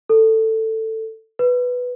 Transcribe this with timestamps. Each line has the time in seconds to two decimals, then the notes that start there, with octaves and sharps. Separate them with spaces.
0.09 A4
1.39 B4